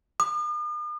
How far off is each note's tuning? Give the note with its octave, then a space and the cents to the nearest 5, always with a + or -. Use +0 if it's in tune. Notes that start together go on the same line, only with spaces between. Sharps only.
D#6 -45